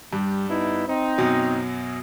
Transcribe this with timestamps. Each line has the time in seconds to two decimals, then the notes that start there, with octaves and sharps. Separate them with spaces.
0.13 G2 G3
0.49 B3 D#4 E4
0.88 C4 D#4
1.18 F#2 B2 F#3